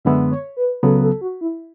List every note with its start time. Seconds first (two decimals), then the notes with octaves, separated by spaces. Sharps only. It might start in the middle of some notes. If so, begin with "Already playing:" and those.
0.05 F#2 D3 G#3 B3 E5
0.31 C#5
0.57 B4
0.83 C#2 C#3 F#3 B3 A4
1.02 A4
1.21 F#4
1.41 E4